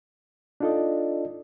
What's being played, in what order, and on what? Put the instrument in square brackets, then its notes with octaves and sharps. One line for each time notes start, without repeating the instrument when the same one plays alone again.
[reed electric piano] D4 D#4 F4 A4 D5 D#5